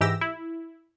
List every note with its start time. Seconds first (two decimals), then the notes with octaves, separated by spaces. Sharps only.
0.01 G#2 E3 G4 E6 A#6
0.21 E4